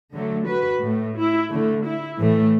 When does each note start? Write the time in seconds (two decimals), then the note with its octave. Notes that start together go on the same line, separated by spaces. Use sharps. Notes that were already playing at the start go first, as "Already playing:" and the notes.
0.14 D3 F#3 A3
0.47 F#4 B4
0.82 A2 A3
1.17 E4
1.51 D3 A3
1.85 E4
2.20 A2 E3 A3